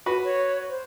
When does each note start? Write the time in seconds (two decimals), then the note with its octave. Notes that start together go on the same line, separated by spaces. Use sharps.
0.06 F#4 B4
0.24 C#5
0.69 C5